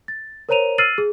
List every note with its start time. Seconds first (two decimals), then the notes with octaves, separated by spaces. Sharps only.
0.08 A6
0.49 A#4 C5 C#5 A#5 D#7 F7
0.78 E6 F6 A6 C7 D#7 F#7
0.98 G#4